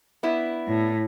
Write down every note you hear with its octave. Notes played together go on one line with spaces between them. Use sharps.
B3 D4 E4
A2